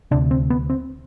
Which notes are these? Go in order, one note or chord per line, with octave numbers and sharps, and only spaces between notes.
D2 C3 D4
C4
B3
C4